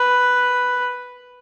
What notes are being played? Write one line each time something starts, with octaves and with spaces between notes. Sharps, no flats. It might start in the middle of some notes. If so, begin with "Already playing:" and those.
Already playing: B4